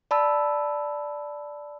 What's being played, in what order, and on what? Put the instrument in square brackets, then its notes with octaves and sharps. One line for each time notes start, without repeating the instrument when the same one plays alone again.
[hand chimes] D5 A5 B5 E6